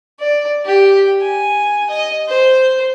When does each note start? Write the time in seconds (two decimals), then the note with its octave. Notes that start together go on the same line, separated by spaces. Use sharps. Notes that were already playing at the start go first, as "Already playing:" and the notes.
0.19 D5
0.65 G4
1.21 G#5
1.90 D#5
2.28 C5